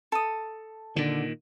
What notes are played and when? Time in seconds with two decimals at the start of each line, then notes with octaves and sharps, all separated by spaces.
0.12 A4 D#6
0.96 A#2 D3 D#3